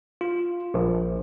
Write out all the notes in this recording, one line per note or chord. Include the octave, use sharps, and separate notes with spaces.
F4
A#1